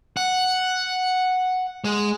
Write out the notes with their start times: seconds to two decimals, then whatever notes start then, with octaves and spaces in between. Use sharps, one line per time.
0.17 F#5
1.84 G#3